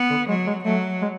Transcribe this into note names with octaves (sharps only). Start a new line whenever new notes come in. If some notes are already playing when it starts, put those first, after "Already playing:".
Already playing: B3
D3
F#3 G#3
G#3
F#3 A3
G#3